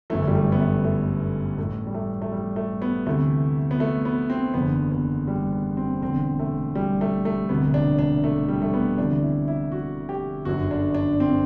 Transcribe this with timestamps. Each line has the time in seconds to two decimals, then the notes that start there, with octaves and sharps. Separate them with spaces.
0.10 G1 F#2 E3 A3
0.27 G3
0.35 A3
0.52 B3
0.60 A3
0.84 A3
1.58 A1 A2 E3 A3
1.87 G3
1.95 A3
2.22 A3
2.32 G3
2.56 A3
2.82 B3
3.06 D2 C3 E3 A3
3.71 B3
3.80 A3
4.05 B3
4.30 C4
4.54 F#1 E2 D3 B3
4.92 B3
5.28 G3
5.52 B3
5.77 C4
6.01 E1 E2 D3 C4
6.40 A3
6.75 G3
7.01 A3
7.25 A3
7.49 E1 D2 C3 B3
7.74 D4
7.99 D4
8.24 A3
8.48 G3
8.62 A3
8.74 B3
8.97 D2 C3 E3 D4
9.22 E4
9.48 E4
9.72 F#4
10.09 G4
10.45 G1 F#2 D3 F#4
10.71 D4
10.94 D4
11.20 C4